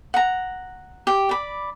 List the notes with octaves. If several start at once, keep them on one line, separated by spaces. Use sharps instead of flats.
F#5 A#5
G4
D5 B5